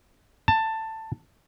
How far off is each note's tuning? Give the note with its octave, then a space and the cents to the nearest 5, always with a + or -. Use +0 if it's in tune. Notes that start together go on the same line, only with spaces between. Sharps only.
A5 +15